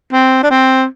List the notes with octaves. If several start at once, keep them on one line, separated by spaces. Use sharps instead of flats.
C4
D4
C4